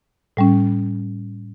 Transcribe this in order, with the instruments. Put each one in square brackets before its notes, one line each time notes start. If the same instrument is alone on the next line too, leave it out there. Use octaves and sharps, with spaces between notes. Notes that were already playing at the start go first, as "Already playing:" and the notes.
[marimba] A2 G3 C#4